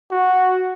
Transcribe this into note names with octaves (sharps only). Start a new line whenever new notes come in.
F#4